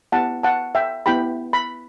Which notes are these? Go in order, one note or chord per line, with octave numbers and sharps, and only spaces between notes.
B3 E4 G4 F#5 A5
F#5 A5
E5 G5
B3 E4 G4 G5 B5
B5